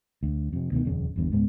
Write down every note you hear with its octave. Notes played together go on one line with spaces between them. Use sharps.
D2
F2 C3
D2 B2 D3 D#3
D#1 F2 C#3
G1 E2 G2
C#2 G#2 G#3 B3